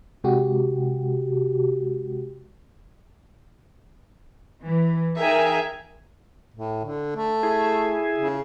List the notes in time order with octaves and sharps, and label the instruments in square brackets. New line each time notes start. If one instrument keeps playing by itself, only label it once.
[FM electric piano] C3 G#3 F#4 G4
[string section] E3
D#4 G#4 A#4 E5 G5 G#5
[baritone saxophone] A2
D3
A3
[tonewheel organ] E4 G#4
[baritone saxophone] C#3